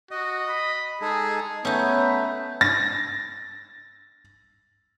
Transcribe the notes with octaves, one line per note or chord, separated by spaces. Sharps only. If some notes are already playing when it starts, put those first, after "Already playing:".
F#4 D#5
B5
G#3 D#4 G#4 A4
A3 B3 C#4 D#4 B4 A#5 G6
A6 A#6